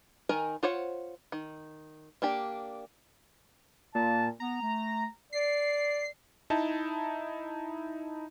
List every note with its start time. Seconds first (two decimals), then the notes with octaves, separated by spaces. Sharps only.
0.29 D#3 A#4 G#5
0.63 F4 C5 C#5 F#5
1.32 D#3
2.22 A#3 D4 G4
3.95 A#2 A5
4.40 B3 A#5
4.62 A3
5.33 D5 C7
6.50 D#4 E4 A5